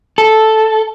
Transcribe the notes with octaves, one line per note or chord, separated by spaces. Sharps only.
A4